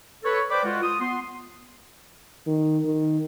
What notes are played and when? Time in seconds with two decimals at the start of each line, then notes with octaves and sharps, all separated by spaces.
0.23 A4 B4 C#5
0.50 B4 C5 D5 G5 B5 D6
0.64 G#3 F4 F#4
0.81 F4 D#6
1.00 B3 C6
2.47 D#3
2.85 D#3